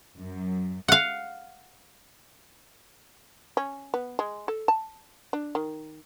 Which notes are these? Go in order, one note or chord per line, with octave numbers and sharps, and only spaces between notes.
F#2
F5 F#5
C#4
B3
G#3
A4
A5
D4
D#3